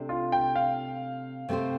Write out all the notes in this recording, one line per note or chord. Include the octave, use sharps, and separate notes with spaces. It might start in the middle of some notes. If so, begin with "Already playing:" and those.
Already playing: C3 A3 D4 G4
F4
G5
F5
C3 A3 C4 G4 C5